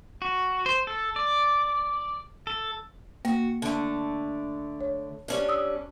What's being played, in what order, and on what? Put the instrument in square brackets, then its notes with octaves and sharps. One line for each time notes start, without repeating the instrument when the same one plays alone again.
[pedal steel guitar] F#4
C5
A4
D5
A4
[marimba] A#3 [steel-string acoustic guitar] F#4
[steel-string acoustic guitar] D3 A3
[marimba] C#5
[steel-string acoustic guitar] G3 C#4 D4
[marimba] D#6 E6